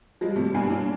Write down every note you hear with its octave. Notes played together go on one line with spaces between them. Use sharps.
F3 G3 G#3
C3 G3 A3
G2 B2 A#3 D4 G#5 C7
A#3 C#4 D4